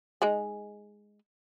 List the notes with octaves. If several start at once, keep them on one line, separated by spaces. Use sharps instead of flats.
G#3 D#4 G#4